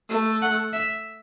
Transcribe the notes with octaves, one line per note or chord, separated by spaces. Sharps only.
A3
F#5
E5